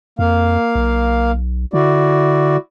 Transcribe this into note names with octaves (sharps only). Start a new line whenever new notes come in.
F2 A#3 F5
B1
D3 E4 F#4 D5